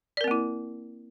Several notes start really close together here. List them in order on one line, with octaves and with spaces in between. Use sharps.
D5 A#4 C4 A#3 E4